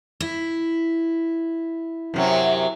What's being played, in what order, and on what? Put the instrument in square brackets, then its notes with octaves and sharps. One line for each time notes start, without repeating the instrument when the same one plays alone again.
[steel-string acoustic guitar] E4
[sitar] F#2 C3 F#3